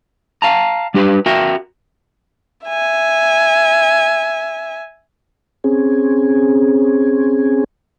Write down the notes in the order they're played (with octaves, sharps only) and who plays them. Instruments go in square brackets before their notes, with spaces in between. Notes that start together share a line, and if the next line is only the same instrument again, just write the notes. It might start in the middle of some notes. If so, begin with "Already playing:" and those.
[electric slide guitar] F5 A5 A#5
G3 D4 G4 A#4 B4
F#4 A#4 E5 G5
[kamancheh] E5 G#5
[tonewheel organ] C4 C#4 G#4